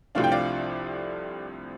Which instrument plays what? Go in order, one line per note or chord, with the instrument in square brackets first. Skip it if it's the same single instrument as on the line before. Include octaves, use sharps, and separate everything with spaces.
[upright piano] C2 C3 F3 A3 D4 F5
G5
D5 F5